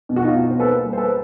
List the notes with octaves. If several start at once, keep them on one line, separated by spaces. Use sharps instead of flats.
B2
F#4
D#4 F4
B2
C5
A#3 A4 B4
G3
C5
A4 B4